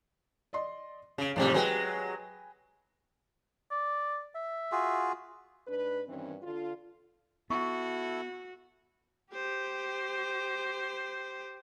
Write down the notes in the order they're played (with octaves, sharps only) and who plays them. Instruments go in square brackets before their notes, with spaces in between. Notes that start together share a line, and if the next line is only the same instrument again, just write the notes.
[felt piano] D5 D#5 C6
[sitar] C#3 [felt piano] C#4 D7
[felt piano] A1 C3 [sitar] F2 G#2 G3
[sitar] F#3 G#3 [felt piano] B4 G5 G#5
[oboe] D5
E5
[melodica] F4 F#4 G#4
[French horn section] G#2 D4 B4
G2 D#3 E3 C4 C#4
D3 F4
[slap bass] B3 [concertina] E4 A4 [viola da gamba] F#4 [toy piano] F#5 C#6
[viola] G4 C5